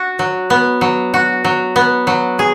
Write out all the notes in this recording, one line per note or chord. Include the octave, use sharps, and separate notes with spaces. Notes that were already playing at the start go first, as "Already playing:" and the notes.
Already playing: F#4
F#3
B3
F#3
F#4
F#3
B3
F#3
G#4